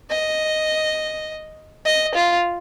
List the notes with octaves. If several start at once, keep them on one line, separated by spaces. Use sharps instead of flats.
D#5
D#5
F4